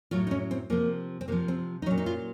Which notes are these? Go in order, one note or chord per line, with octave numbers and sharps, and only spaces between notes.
A2 F#3 F4
D#4
C#4
C4
C3 F3 A#3
C4
C3 F3 A#3
C4
D#4
A#2 F#3 C#4
D#4
F4